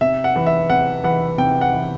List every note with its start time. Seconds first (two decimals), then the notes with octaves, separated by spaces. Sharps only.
0.01 C3 E5
0.24 F#5
0.36 E3
0.46 E5
0.70 C3 F#5
1.04 E3 F#5
1.38 C3 G5
1.61 F#5
1.73 E3